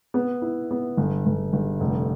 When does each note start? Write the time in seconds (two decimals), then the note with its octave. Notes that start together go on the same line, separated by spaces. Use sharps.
0.14 B3
0.42 E4
0.71 B3
0.97 G1
1.26 G1
1.53 G1
1.80 F1